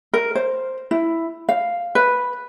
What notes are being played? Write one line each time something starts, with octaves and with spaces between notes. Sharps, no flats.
A#4
C5
E4
F5
B4